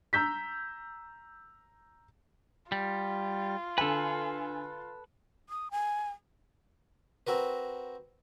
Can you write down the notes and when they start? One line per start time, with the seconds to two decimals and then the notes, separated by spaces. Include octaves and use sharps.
0.13 A#5 E6 G6 B6
2.72 G3 F4
3.78 D3 A4 B4 G#5
5.49 D#6
5.71 G#5
7.27 C4 F#4 A#4 B4